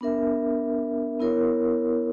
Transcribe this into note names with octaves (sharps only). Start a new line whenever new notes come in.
B3 D4 A#4 E5
B3 E4 A#4 C#5